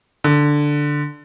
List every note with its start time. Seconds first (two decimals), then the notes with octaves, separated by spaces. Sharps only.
0.24 D3